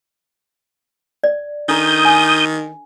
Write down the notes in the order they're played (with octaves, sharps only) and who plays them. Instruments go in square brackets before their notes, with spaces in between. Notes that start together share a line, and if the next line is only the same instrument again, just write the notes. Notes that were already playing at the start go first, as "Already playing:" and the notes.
[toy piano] D5
[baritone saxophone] D#3 [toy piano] D4 A4 A#5 [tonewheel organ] D#6 G6
[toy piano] G#5